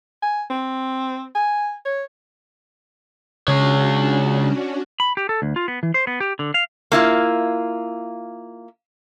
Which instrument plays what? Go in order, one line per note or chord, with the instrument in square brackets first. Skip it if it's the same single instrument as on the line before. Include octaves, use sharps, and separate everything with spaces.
[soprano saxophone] G#5
C4
G#5
C#5
[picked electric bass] C#3 [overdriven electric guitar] G#3 C#5 [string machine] C#4 D4 F#4
[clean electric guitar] B5
G4
A4
D2
F4
B3
E3
C5
B3
G4
D3
F5
[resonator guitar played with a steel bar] A#3 E4 F4